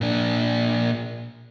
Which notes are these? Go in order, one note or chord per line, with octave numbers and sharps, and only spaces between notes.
A#2 D4